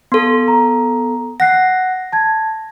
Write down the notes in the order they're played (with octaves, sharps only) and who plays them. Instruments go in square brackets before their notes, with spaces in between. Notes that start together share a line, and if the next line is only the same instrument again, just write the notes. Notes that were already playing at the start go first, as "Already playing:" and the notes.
[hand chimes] B3 A4 [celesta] C6
[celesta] A#5
[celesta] F#5 F#6 C7 [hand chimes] A#6
[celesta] A5 G#6